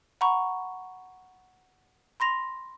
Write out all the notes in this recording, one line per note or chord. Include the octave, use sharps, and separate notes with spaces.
F#5 A#5 B5 C#6
B5 C6 A#6 F7